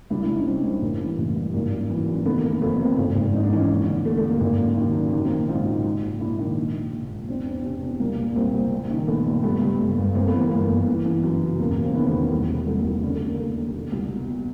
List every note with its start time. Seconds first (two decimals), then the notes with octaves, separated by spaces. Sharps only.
0.10 C2 D4 E4
0.22 D4 E4
0.28 C2
0.34 C#4 D#4
0.46 C2 C4 D4
0.64 C2
0.82 A1 A#3
1.00 E3
1.18 A1
1.36 G2
1.54 G#1 A#3
1.72 F#2
1.90 E3
2.08 F#2
2.26 D#3 A3 B3
2.38 A#3
2.43 F1
2.50 A#3
2.61 F2 A3 B3
2.80 F1 A#3 C4
2.98 G#1
3.16 G#1
3.33 G#2 D#4
3.44 D4
3.52 E3 C#4 D#4
3.69 D#2
3.87 D3
4.05 D#2 A3
4.17 A3
4.23 D#2
4.30 A#3
4.41 G#1 A#3
4.59 F#2
4.77 D#3
4.95 F#2
5.13 D#3
5.25 A#3 C4
5.30 A#1
5.37 A#3 C4
5.49 G#2 D#4 F4
5.67 A#1
5.85 A#1
6.03 G#2
6.20 A#1 D4 E4
6.38 D#3
6.57 A#1
6.74 A#1
6.93 A#1
7.10 G#2
7.28 E2 C4 D4
7.46 E2
7.64 C3
7.83 E2
8.00 C2 A#3
8.18 A#2
8.36 C2 A#3 C4
8.54 C2
8.72 A#1
8.90 D#3
9.07 A#1 A3 B3
9.26 A#1
9.44 G2 A3 B3
9.62 G2
9.79 G2
9.98 G1
10.15 G1 A#3 C4
10.27 A3 B3
10.34 E3
10.40 A#3
10.51 G1 A#3
10.70 G1
10.87 E3
11.06 E3
11.24 F#2
11.41 C#3
11.59 E1 A#3
11.71 A#3
11.77 E1
11.83 A#3 C4
11.95 D#3 B3 C#4
12.07 A3 B3
12.13 E1
12.19 A#3
12.31 C2 A3
12.49 C3
12.67 C2 A3
12.79 A#3
12.85 C2
13.03 D3 B3 C#4
13.15 A3
13.21 D#2
13.27 A#3
13.38 D3 A3
13.57 D#2
13.75 B2
13.92 C2
14.11 B2
14.28 B2